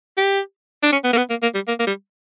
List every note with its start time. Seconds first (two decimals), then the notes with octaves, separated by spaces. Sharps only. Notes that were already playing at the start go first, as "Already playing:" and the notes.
0.17 G4
0.83 D4
0.92 C#4
1.04 B3
1.13 A#3
1.17 B3
1.30 A#3
1.42 A#3
1.55 G3
1.68 A#3
1.79 A#3
1.87 G3